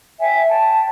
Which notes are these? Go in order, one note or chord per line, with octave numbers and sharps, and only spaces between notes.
C#5 E5 G5 G#5
C#5 G5 A5